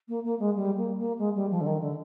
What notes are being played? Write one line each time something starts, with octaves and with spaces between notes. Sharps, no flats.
A#3
A#3
G#3
G3
A#3
A#3
G#3
G3
F3
D3
D#3
D3